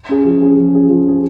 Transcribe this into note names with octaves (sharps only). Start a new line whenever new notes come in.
C#4 G#4
F3
C#4 G#4
F3
C#4 G#4
F3
C#4 G#4